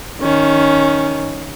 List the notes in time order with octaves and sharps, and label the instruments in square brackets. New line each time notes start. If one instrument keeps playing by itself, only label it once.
[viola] D#3 C#4